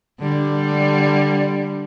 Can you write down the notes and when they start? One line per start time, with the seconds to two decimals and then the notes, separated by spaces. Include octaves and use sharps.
0.20 D3 G3